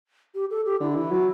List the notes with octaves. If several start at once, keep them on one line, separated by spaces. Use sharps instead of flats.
G4
A4
G4
D3 E4
E3
F#3